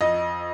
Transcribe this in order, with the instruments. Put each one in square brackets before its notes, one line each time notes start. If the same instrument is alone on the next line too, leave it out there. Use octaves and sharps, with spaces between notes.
[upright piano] F2 D#5